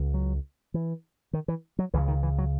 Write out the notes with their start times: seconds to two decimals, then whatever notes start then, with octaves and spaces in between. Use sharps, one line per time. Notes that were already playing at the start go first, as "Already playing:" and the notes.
Already playing: C#2 C#3
0.14 F#3
0.74 E3
1.33 D#3
1.48 E3
1.79 F#3
1.94 C#2 E3
1.97 C#3
2.08 D#3
2.23 E3
2.38 F#3